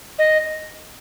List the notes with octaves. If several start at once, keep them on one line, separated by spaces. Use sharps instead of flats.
D#5